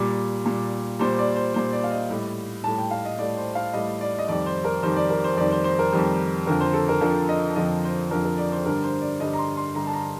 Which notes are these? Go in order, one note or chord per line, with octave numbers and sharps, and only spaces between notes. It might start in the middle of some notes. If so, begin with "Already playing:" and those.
Already playing: A#2 G3
A#2 G3
A#2 G3 C5
D5
C5
A#2 G3 C5
D5
F5
D#5
A2 G3
A2 G3 A5
G5
F5
D#5
A2 G3 D5
C5
F5
A2 G3 D#5
D5
D#5
F2 D#3 G3 D5
C5
A#4
F2 D#3 G3 C5
D5
A#4
C5
F2 D#3 G3 D5
C5
C5
A#4
F2 D#3 G3
F2 D3 F3 A#4
C5
A4
A#4
F2 D3 F3 A#4
D#5
F2 D3 F3 D#5
C5
F2 D3 F3 A#4
A#4
D5
C5
G2 D3 G3 A#4
C5
D5
G2 D3 G3 D#5
A#5
C6
C6
G2 D3 G3 A#5
A5
A#5